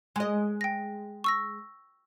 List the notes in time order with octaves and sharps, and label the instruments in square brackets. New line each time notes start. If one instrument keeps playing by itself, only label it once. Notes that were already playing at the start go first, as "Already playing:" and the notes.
[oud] G#3 D#5
[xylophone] G5 A#6
C#6 E6 A#6